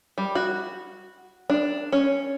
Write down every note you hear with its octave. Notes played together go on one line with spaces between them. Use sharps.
G3
F#4
D4
C#4